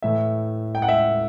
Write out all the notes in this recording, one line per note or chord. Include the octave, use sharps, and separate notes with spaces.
A2 E3 A3 E5
G5
F#5
E5